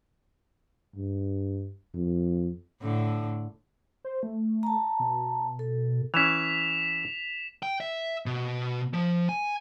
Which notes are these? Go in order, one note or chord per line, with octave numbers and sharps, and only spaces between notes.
G2
F2
A2 D3
C5
A3
A5 A#5
B2
A4
E3 C#4 B6 E7 F7
G5
E5
B2
F3
G#5